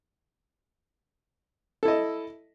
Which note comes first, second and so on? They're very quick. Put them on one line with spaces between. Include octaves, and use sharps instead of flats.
A4 E4 D#5